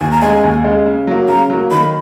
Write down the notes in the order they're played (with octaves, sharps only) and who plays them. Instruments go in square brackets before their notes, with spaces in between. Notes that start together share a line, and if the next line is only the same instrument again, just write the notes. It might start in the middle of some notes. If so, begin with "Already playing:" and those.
[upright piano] D#2 [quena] G#5
[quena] A#5
[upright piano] C#3 G#3 [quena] G#5
[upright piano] D#2
C#3 G#3
C#3
F#3 A#3
[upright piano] C#3 [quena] A#5
[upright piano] F#3 A#3
[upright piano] D#3 [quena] B5